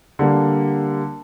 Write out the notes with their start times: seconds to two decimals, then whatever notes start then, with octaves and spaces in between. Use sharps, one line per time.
0.19 D3 G3 A#3